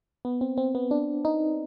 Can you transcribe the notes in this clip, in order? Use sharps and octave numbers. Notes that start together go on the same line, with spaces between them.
B3
C4
C4
B3
D4
D#4